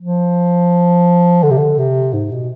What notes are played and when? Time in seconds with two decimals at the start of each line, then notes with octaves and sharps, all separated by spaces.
0.01 F3
1.43 D3
1.50 C3
1.58 D3
1.78 C3
2.13 G#2
2.32 B2